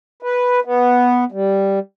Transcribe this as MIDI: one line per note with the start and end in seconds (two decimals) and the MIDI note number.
0.23 0.60 71
0.65 1.24 59
1.32 1.79 55